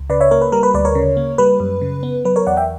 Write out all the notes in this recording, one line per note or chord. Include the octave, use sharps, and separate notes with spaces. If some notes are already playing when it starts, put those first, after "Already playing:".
Already playing: C#2
C#3 B4 D5
C#5 E5
A#3 A#4 C#5
B4
G3 A#4
B4
D2 B4 D5
A#4 C#5
C#3
A#3
G3 B4
F#2
C#3
B3
F#3 B4
A#4 C#5
E2 D5 F#5
E5 G5